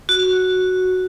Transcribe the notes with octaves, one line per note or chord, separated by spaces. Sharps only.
F#4